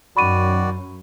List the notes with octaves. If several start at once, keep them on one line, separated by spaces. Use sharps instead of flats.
F#2 D#3 F#4 D5 B5 C#6 D#7